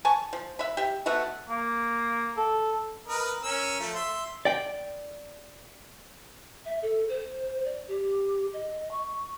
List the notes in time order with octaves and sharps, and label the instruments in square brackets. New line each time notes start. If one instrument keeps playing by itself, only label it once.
[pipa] G#5 A5 C#6
F3
E5 B5
G4 E5
A3 B3 F#4 E5
[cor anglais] A#3
A4
[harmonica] A#4 B4 D#5
C#4 A#4 E6
F3 A3
E5 C6
[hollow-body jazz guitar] D5 G5
[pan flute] E5
A4
C5
D5
G4
D#5
C#6